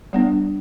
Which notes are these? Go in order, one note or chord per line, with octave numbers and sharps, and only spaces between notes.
G3 B3 D4